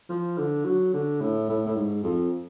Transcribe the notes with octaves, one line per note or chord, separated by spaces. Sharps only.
F3
D3
F#3
D3
A2
A2
A2
G#2
F2